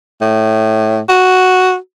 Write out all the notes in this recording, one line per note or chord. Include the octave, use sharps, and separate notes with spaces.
A2
F#4